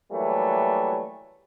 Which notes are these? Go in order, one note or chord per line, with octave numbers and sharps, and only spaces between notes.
E3 F#3 G3 A3 A#3